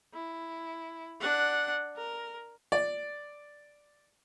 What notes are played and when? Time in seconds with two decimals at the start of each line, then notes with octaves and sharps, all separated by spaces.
0.14 E4
1.20 D4 F#5
1.96 A#4
2.72 D5